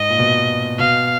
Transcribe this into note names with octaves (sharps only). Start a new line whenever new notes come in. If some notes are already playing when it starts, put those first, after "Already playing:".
Already playing: G#2 D#5
A#2
B2
B2 F5